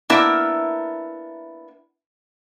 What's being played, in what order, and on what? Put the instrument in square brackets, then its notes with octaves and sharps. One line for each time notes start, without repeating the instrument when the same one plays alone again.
[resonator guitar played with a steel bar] A#3 B3 D4 E4 A#4 E5